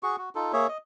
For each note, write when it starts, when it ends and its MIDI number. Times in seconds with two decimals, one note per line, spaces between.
0.03 0.16 66
0.03 0.16 68
0.03 0.16 85
0.18 0.29 66
0.35 0.52 63
0.35 0.52 65
0.35 0.52 69
0.53 0.67 58
0.53 0.67 68
0.53 0.67 73
0.53 0.67 76
0.69 0.78 75